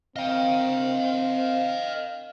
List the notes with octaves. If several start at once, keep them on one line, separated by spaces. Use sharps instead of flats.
C4 D#5 F5 G5